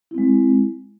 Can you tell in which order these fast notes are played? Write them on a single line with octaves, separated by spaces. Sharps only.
E4 C4 G#3